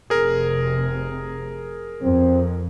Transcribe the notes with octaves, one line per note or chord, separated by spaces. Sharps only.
F1 C3 G#4 A#4
F2 C4